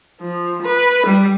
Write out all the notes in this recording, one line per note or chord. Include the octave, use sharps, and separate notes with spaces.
F3
B4
G3